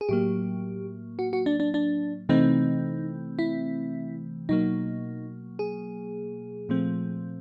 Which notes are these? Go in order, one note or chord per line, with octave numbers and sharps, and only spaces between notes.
G#4
A2 F#3 A#3 G4
F#4
F#4
D4
D4
D4
C3 E3 A3 C4 D#4
E4
B2 F#3 A#3 D#4
G#4
A#2 F3 A3 C4